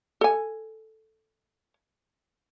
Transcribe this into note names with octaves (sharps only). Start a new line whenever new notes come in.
A4 G#5